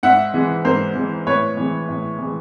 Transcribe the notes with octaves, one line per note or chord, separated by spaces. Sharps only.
G#2 E5 F#5
E3 G#3
G#2 A#4 C5
E3 G#3
A2 B4 C#5
E3 G#3
A2
E3 G#3